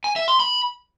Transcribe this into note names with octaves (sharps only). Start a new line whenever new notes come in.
G#5
E5
C6
B5